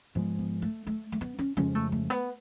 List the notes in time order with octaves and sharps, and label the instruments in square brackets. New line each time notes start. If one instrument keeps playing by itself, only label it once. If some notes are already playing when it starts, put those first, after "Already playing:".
[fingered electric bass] G#2 F3 G#3 [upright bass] B3
[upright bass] B3
A3
A3
A3
B3
C#4
[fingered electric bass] F2 C#3 F3 G#3 [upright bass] C#4
[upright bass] A3
A3
B3